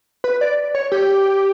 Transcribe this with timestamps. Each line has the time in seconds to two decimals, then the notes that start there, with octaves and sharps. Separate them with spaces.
0.24 B4
0.41 D5
0.75 C#5
0.92 G4